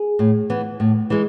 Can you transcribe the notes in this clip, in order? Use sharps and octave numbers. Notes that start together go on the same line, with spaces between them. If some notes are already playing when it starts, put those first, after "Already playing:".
Already playing: G#4
A2
E3 B3
A2
E3 G#3